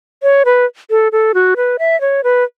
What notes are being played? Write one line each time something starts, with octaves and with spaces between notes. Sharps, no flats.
C#5
B4
A4
A4
F#4
B4
E5
C#5
B4